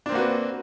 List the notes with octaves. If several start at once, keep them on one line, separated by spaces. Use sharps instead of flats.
A#3 C4 D4 F#4 B4